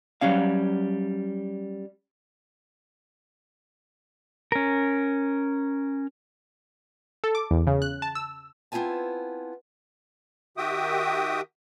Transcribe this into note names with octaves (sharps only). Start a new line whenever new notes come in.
F#3 G3 C#4 F5
C#4 A#4
A4
D6
E2
C#3
F#6
A5
E6
B3 C4 E4 F4 G#5 A5
D#3 F#4 G4 E5 G5 D#6